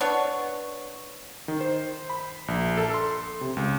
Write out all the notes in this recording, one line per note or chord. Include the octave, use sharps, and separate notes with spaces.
B3 D4 C#5
D#3
C5
B5
A#1
A4
C6
C3
C#2